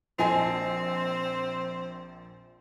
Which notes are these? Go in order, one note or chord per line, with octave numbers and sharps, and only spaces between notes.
A#1 C4 A4 D#5 G#5 A5